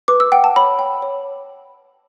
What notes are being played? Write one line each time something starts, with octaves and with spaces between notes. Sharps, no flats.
B4 D6
E6
F#5 G5
A5
C#5 B5
G5
C#5